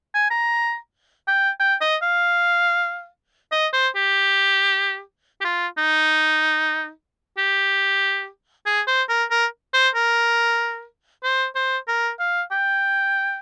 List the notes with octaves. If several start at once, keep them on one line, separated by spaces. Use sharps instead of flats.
G#5
A#5
G5
G5
D#5
F5
D#5
C5
G4
G4
F4
D#4
G4
G#4
C5
A#4
A#4
C5
A#4
C5
C5
A#4
F5
G5